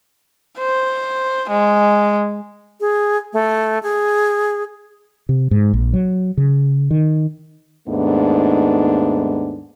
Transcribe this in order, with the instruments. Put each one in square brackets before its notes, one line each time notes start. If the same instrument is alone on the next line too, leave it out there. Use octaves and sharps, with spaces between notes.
[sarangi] C5
G#3
[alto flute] G#4
A3
G#4
[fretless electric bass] C3
G#2
A#1
F#3
C#3
D#3
[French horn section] D#2 G#2 A3 B3 D4